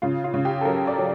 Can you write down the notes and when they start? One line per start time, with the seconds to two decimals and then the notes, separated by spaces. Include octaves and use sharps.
0.02 C#3 F4
0.24 F4
0.34 C#3
0.45 G4
0.61 A4
0.65 F#3 A#4
0.87 D5
0.98 F#3